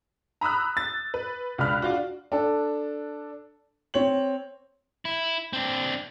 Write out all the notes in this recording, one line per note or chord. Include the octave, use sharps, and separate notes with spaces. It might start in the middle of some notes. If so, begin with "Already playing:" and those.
A#5 B5 D#6 E6 F#6
A6
B4
C#2 D4 B5 F6 F#6
D4 F4 F#4
D4 A4
C4 C#5 F#7
E4
C4 D4